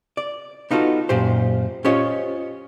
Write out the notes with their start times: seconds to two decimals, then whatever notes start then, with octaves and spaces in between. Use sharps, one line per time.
0.17 D5
0.71 B3 D#4 F4 F#4 A4
1.09 F#2 A#2 G4 C5
1.85 C#4 F4 G4 C5 C#5 D#5